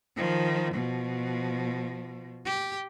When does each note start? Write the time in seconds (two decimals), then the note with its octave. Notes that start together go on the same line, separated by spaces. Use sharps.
0.17 D#3 F3
0.74 B2 F3
2.46 G4